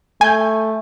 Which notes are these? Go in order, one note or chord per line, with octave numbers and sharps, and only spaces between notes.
A3 G#5 G6